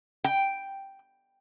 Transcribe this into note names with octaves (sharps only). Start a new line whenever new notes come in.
G5